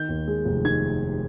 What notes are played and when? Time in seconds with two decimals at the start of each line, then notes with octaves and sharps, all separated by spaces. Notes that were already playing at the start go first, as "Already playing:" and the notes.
Already playing: D#3 G6
0.09 D#2
0.28 G#3
0.45 F1
0.65 D#3 G#6